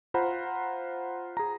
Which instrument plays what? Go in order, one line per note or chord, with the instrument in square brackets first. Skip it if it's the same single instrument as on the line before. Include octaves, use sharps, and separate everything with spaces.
[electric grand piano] F4 C5 F#5 A#5 B5
G#4 A#5